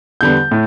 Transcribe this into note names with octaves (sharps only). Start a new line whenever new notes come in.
E2 D3 G3 B3 G6
A2